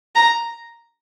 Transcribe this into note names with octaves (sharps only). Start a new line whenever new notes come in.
A#5